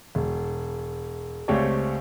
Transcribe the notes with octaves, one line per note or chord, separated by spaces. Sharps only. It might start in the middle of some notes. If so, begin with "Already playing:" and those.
E1
C#2 A3 C4 G4 C#5 D5